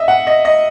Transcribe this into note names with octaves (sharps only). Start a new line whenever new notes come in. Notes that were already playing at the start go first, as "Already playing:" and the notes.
Already playing: D#5 E5
F#5
D#5
D#5